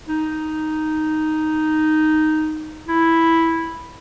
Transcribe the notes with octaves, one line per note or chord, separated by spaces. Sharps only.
D#4
E4